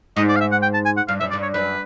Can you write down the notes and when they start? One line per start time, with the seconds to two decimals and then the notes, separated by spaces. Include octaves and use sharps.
0.16 G#2 D#5
0.28 D5
0.36 F5
0.40 E5
0.52 F#5
0.62 G5
0.74 A5
0.85 G#5
0.97 F#5
1.08 G2 F5
1.20 F#2 E5
1.31 D5
1.33 G2
1.42 C#5
1.54 F#2 B4